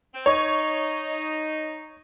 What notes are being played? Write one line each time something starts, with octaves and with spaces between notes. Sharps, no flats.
C4
D#4 C#5